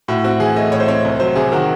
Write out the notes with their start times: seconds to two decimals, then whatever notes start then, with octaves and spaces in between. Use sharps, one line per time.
0.08 A2 F#4
0.24 C4 F#4
0.40 E3 G#4
0.56 A3 D#5
0.72 A2 C#5
0.80 C5
0.88 C4 C#5
1.05 C2
1.20 F#3 C5
1.35 C3 G#4
1.52 D#3 F#4